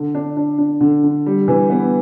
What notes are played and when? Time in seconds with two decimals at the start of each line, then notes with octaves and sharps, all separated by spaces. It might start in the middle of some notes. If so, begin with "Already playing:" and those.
Already playing: D3
0.15 D4
0.37 D4
0.58 D4
0.81 D3
1.04 D3
1.26 G3
1.48 E3
1.70 B3